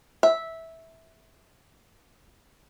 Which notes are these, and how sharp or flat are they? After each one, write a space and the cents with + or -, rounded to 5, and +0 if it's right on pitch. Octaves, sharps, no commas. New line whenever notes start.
E5 -10